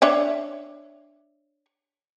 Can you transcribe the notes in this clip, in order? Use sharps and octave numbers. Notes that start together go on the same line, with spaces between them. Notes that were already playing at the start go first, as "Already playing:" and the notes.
D4 C#5 E5